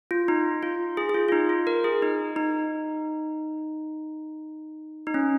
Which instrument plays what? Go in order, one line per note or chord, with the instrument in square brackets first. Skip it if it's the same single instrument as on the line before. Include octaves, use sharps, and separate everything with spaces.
[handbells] F4
D#4
F4
G#4
G#4
F4
F4
D#4
F4
A#4
G#4
D#4
D#4
D#4
C#4